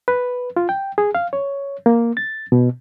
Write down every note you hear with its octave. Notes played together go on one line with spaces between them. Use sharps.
B4
F4
G5
G#4
F5
C#5
A#3
A6
B2